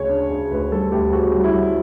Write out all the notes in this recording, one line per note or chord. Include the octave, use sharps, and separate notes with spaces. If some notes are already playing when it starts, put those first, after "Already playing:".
Already playing: D2 C#3 C#5
D4
C#3
D2 B4
G3 A4
D2 G4
C#3 F#4
G3
E4
G3